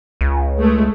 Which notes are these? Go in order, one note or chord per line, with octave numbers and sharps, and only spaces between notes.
C#2
G#3 A3